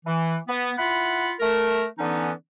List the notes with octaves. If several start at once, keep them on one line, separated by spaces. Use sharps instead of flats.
E3
B3
E4 F4 F#5 B5
A3 A#4
D3 E3 B3 C#4 D#4